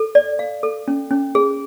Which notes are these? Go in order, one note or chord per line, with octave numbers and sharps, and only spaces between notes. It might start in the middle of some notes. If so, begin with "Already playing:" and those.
Already playing: A4
D5
F5
A4
C#4
C#4
G#4